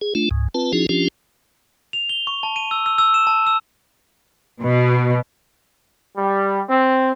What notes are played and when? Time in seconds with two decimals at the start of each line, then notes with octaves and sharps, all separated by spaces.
0.01 G#4
0.15 A3 D4 F4
0.31 C#2 G#2
0.54 C4 F4 B4 A5
0.73 F3 C#4 D#4 E4 F#4 G#4
0.89 F3 C#4 D4 F4 G4
1.93 F7
2.09 G7
2.27 C#6
2.43 A5
2.56 D#7
2.71 E6
2.86 E6
2.98 E6
3.14 E7
3.27 A5
3.47 E6
4.62 B2
6.17 G3
6.69 C4